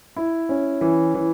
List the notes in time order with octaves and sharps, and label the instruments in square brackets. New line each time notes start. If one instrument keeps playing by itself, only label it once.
[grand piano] E4
C#4
E3
E3